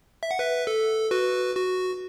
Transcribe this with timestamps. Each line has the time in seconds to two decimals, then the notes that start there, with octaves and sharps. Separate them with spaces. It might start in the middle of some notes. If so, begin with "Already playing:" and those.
0.23 E5
0.31 F#5
0.39 B4 E5
0.67 A4
1.11 F#4 B4
1.55 F#4